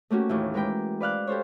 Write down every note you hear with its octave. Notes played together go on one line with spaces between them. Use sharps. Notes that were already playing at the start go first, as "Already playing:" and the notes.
A3 A#3 C#4 F#4 G4
D#2 A2 E3
G#3 A#4 B4 G5 D6
B4 D5 F5 F#6
G4 A4 C5 C#5